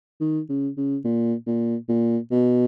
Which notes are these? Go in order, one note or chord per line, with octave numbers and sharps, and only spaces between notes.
D#3
C#3
C#3
A#2
A#2
A#2
B2